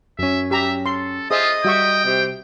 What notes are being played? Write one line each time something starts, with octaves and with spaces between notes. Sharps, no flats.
F#2 C#4 E5
G4 E5 A#5
A4 C6
F4 G#4 C5 D#5 E5
G3 F#4 E5 G5 C#6
C3